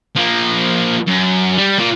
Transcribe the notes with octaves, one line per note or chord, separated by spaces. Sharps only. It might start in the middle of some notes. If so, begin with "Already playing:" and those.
F3 A#3
F#2
G3
A#2